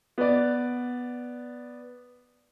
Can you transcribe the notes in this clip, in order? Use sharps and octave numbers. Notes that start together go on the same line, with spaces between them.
B3 D5